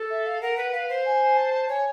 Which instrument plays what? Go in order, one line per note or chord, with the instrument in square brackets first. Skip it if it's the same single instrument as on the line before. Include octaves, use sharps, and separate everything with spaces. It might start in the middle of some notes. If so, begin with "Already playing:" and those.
Already playing: [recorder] A4
[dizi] E5
F5
[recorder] A#4 [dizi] F#5
[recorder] B4
[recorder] B4 [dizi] F5
[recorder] C5
[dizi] G#5
A5
[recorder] C#5 [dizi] G#5